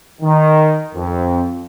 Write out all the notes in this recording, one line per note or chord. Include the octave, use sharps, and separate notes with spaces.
D#3
F2